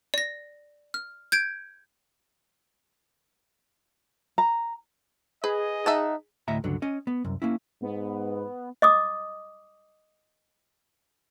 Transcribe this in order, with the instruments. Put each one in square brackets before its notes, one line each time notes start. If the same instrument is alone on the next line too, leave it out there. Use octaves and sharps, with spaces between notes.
[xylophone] D5 A#6
F6
G6 G#6 D7
[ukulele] A#5
[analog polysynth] G#4 [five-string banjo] B4 [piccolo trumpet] D#5
[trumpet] D#4 [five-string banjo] E5 F#5 A5
[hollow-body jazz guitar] D2 A2 D#5 E5 A#5
C#2 G2 D3 F#3
C#4 D#5
B3
C2 F#2
A#3 C#4 E4
[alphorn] G#2 [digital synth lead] B3
[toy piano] D#5 D6 D#6